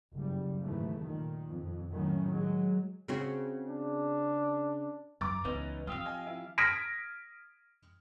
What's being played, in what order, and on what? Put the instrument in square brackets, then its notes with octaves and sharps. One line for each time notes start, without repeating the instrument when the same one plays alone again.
[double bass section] F#1 G3
D#2 G#2 E3 A3
A#2 D#3
F2
A2 D#3 F#3 C#4
F#3 G#3
[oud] C#3 C4 F#4
[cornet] D4
[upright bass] F#2 D#4 [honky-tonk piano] A#5 D6 A6
[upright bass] C#2 [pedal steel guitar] E3 C#4 D#4 [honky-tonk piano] B3
[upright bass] F3 C4 [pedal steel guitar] F4 G4 F5 [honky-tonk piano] D#6 E6
[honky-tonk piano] D#5 G#5
E4
[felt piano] D#6 F6 G#6 A#6 B6 D7